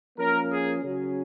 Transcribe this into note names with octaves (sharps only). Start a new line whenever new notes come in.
F3 A#3 C#4 A#4
G#4
C#3 F#3 C#4